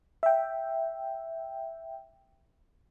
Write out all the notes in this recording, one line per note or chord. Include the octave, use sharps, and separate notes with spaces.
E5 G5